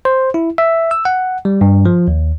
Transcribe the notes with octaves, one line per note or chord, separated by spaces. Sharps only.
C5
E4
E5
E6
F#5
G3
G2
F3
D#2